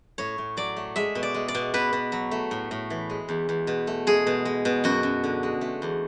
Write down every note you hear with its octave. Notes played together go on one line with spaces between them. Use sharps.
A2 C#5
A2
F#3 D5
A3
G#3 E5
B2
D5
G#3
D5
B2
B2 B4
B2
F#3
A3
A2
A2
E3
G#3
E2
E2
B2
A3
G#3 G#4
B2
G#3
B2
F#2 F#4
F#2
D3
G#3
A3
E2